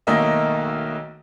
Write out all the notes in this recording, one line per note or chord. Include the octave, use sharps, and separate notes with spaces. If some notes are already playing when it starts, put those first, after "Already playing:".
B1 D#3 A3 A#3 D#5 E5